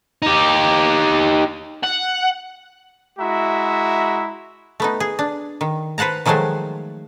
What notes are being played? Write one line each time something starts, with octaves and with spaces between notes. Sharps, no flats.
D#4 G4
F#5
G#3 E4 F#4 E5 A#5
A3 B3 D#4
G#4
D4
D#3
B4 C5 F#5 A5 A#5
D#3 F3 F#3 G#3 A3 C5